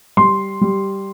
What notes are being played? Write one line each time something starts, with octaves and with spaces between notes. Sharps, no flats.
G3 C6
G3